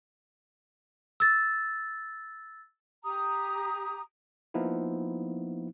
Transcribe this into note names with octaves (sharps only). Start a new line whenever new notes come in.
E6 A6
G4 A#5 D#6
F3 A#3 B3 D#4 E4